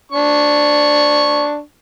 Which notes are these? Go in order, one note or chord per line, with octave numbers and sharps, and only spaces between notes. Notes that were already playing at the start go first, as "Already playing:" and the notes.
D4 C#6